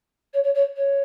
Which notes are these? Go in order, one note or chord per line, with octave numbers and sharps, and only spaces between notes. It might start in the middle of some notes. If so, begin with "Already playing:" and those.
C#5
C#5
C#5
C#5